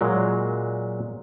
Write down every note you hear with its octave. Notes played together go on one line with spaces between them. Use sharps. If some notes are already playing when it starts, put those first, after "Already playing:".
A#2 F#3 G#3